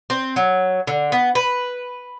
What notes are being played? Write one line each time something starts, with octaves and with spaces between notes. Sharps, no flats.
C4
F#3
D3
B3
B4